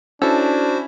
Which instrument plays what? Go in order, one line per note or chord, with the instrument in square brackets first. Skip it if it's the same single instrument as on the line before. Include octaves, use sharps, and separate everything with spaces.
[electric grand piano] C#4 E4 [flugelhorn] D4 [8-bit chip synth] F#4 C5 [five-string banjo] A4